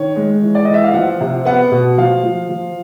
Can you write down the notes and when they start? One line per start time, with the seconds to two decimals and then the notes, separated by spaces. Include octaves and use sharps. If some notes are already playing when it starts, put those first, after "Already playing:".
Already playing: D#3 C#5
0.16 G#3
0.42 E3
0.55 D5
0.65 E3 D#5
0.74 E5
0.84 F5
0.94 F3 F#5
1.20 C3
1.45 B3 F#5
1.71 B2
1.98 F3 F5
2.23 F3
2.49 F3